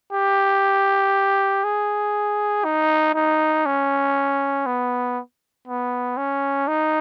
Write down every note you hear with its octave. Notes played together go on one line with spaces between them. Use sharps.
G4
G#4
D#4
D#4
C#4
B3
B3
C#4
D#4